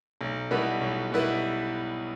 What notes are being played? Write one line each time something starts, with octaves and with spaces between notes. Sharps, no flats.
B1
B2 G3 E4 B4
B1
B2 G3 E4 B4